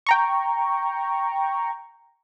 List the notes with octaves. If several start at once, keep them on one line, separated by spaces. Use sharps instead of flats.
G5 A#5 C#6